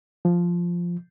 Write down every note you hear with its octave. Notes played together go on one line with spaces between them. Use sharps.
F3